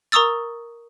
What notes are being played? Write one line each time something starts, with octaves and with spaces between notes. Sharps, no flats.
A#4 A#5 C#6 D#6 E6 A6